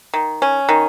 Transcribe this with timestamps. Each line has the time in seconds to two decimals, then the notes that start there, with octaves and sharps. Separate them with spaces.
0.14 D#3
0.42 C#4
0.69 D#3